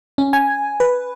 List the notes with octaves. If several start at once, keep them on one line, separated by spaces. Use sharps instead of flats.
C#4
G#5
B4